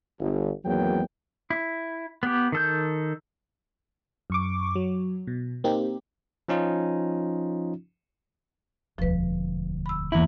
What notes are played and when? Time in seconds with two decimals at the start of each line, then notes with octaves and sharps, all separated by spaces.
0.19 G1
0.64 G#1 E2 F#3 A#3 G5
1.50 E4
2.23 B3 G4
2.52 D#3 A4 G6
4.30 F#2 C#6 D6
4.75 F#3
5.27 B2
5.64 A#3 C4 D#4 G4
6.48 F3 C#4 D#4 F4
8.98 E1 D2 F3 B4
9.86 B5 E6
10.12 E2 G2 E3 A#3 E4